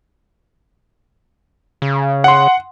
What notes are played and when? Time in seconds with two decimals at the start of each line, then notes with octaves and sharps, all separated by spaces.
1.82 C#3
2.24 F#5 C6